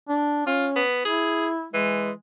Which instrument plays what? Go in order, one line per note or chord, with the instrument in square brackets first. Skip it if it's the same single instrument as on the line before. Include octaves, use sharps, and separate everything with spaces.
[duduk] D4
[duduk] C#4 [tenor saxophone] F4
[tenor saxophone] B3
[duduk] E4 [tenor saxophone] G#4
[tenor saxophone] E3 [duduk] G#3